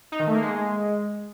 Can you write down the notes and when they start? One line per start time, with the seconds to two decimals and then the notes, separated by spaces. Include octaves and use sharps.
0.12 D#4
0.19 D#3
0.27 A3
0.35 A#3
0.42 G#3